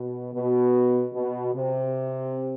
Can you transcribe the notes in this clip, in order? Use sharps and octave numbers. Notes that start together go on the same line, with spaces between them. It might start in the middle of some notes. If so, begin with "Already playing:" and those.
Already playing: B2
B2
B2
C3